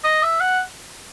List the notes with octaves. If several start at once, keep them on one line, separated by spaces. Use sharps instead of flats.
D#5
E5
F#5